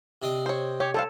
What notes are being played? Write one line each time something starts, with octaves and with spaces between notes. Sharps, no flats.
C3 D4 D#5
C5 C#5
G4 C#5
G3 A4 C5 F5